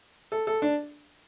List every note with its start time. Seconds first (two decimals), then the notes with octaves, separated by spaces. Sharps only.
0.32 A4
0.47 A4
0.62 D4